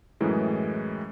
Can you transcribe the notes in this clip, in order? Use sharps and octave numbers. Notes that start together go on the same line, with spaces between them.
F#2 A2 E3 G#3